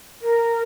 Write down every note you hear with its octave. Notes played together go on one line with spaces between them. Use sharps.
A#4